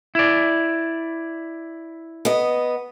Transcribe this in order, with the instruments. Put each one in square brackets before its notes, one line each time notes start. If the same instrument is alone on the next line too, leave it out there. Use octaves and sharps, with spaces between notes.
[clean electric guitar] E4 D5
[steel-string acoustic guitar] B3 D#5